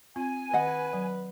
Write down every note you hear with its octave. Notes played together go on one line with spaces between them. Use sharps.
C4 F4 G#5
D#3 B4 D#5 F#5
F#3